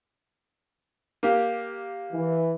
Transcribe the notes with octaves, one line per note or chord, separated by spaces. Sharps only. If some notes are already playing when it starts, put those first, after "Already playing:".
A#3 G4
E3